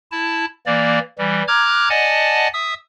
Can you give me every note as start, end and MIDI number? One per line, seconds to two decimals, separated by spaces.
0.11 0.45 64
0.11 0.45 81
0.66 0.99 52
0.66 0.99 58
0.66 0.99 74
1.18 1.43 52
1.18 1.43 55
1.48 1.89 82
1.48 1.89 86
1.48 1.89 89
1.48 1.89 90
1.48 1.89 92
1.90 2.48 74
1.90 2.48 75
1.90 2.48 78
1.90 2.48 80
1.90 2.48 81
2.53 2.74 76
2.53 2.74 87
2.53 2.74 88